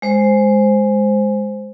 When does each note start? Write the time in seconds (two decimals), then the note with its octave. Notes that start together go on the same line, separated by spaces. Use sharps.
0.02 G#3 C5